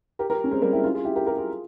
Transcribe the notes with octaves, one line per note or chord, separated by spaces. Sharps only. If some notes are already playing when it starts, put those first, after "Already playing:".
G4 A#4
G4 A#4
C#4
G#3 C4
G3 A#3
E4 G4
C#4 F4
F4 G#4
E4 G4
G4 A#4
G4 A#4
F4 G#4